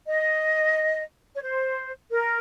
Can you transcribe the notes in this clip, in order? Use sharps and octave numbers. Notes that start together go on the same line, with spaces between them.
D#5
C#5
C5
A#4